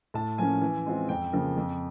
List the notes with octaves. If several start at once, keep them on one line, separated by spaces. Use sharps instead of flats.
A2 A5
F3 A#3 C#4 G#5
E3
G#3 C4 F4
F2 G5
C#3 F3 A#3
F2